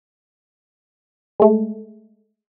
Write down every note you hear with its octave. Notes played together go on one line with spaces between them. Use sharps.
G#3 A3